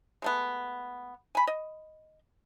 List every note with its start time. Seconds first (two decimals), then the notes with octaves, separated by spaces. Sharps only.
0.22 G#3 A3 B3
1.35 G#5 B5
1.47 D#5